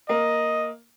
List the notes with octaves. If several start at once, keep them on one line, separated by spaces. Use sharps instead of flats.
A#3 D#5